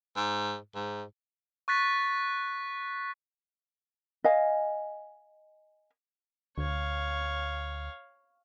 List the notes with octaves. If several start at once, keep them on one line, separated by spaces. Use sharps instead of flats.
G#2
G#2
C#6 F#6 A6 B6
D#5 F5 G#5
D2 C#5 F5